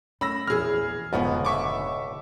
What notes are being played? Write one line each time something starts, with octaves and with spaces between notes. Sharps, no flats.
A3 C#4 B5 E6 A#6
A#1 E2 G#4 F6
F1 C#2 G#2 B2 D3 F3 B3
E5 C#6 D6